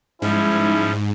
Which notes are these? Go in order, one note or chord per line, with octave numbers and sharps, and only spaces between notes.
G#2 F3 G3 C#4 E4